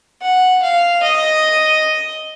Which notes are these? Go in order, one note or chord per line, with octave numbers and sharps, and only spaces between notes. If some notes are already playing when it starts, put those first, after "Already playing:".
F#5
F5
D#5